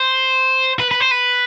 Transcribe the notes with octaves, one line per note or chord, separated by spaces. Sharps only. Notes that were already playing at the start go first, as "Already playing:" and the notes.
Already playing: C5
B4
B4
C5
B4